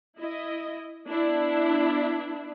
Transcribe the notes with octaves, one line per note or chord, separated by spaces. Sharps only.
E4 D#5
B3 D4 E4